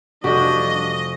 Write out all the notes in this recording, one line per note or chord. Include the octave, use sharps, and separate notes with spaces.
F1 E3 G3 D4 F#4 G4 D#5